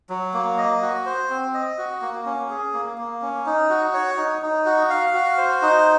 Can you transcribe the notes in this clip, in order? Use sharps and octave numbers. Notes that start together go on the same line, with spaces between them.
F#3
A#3
D#5
F#4
C5
C4
D#5
F#4
A#3
C#4
G#4
A#3
A#3
C#4
D#4
F#4
C#5
D#4
D#4
F#4
F5
F#4
C5
D#4